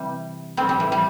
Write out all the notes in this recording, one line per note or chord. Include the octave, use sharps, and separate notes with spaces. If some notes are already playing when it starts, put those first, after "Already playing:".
Already playing: C3 E3 G3
G3 C4
G3
E3
G3